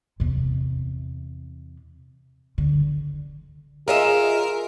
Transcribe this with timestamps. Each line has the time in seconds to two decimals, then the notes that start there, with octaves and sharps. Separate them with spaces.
0.20 E2 C3
2.58 D3
3.88 F4 G#4 A#4 D#5 E5